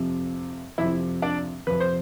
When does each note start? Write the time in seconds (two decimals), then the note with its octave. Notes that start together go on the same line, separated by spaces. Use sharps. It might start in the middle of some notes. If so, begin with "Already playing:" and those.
Already playing: F2 C3 F3
0.78 F2 C3 F3 E4 E5
1.22 D4 D5
1.67 F2 C3 F3 B4
1.80 C5